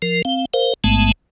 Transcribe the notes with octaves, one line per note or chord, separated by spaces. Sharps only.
F3 A#4
C4 F5
A#4 C5 F5
A1 G#2 G#3 A3 B3 A5